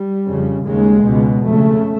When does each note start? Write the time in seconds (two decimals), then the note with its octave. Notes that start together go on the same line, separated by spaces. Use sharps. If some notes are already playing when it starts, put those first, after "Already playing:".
Already playing: G3
0.27 F2 C#3
0.66 D#2 C#3 G#3
1.04 C#2 B2
1.43 F2 C#3 A3